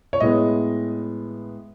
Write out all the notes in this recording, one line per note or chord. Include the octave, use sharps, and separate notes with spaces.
C#5
A2 G#3 B3 D#5